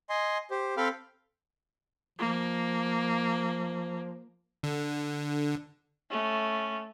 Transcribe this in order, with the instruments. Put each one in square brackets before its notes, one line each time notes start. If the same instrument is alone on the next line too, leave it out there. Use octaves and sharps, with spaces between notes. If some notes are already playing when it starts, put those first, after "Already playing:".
[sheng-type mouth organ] D#5 G#5 C6
G4 C5
C4 A4 F5 G5 B5 F6
[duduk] F3 [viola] A#3
[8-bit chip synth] D3
[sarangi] A3 [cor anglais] C#4